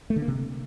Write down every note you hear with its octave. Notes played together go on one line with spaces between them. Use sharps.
A3
D3
A#3
C3